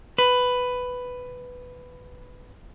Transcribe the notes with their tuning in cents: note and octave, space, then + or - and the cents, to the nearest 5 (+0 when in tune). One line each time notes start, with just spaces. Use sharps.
B4 +10